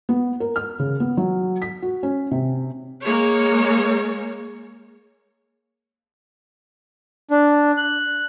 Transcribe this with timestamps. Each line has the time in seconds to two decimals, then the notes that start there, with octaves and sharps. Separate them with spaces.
0.09 B3
0.40 A#4
0.56 F6
0.79 C#3
1.00 B3
1.17 F#3
1.62 B6
1.82 F#4
2.03 C#4
2.31 C3
3.03 G#3 A#3 C#5
7.31 D4
7.77 F#6